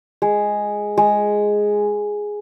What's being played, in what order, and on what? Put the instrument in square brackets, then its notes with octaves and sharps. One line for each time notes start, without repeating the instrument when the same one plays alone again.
[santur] G#3
G#3